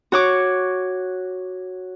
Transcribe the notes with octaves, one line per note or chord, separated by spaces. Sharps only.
F#4 C#5 D6